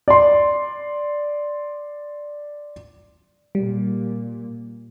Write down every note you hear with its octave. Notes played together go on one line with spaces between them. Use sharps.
D5 C6
A#2 G3